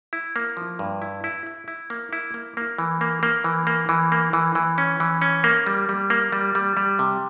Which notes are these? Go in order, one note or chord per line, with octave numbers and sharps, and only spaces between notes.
E4
A#3
F3
G2
E4
E4
E4
E4
A#3
E4
A#3
A#3
E3
A#3
A#3
E3
A#3
E3
A#3
E3
E3
C#4
E3
C#4
A#3
G3
G3
A#3
G3
G3
G3
C3